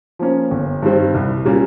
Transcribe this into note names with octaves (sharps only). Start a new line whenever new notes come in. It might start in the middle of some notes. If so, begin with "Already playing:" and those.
F3 A#3 C#4
G1
G2 D#3 G3 C4
C2
A#2 G3 A#3 C#4